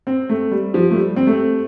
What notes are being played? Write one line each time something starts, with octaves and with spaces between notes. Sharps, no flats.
C4
A3
G3
F3
A3
G3
C4
A3